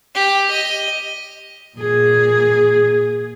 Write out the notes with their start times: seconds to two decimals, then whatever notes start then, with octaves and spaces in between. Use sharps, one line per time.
0.15 G4
0.51 D#5
1.78 A#2 G#4